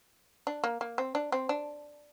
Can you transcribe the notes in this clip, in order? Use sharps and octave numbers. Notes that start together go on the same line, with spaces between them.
D4
A#3
A#3
C4
D4
C4
D4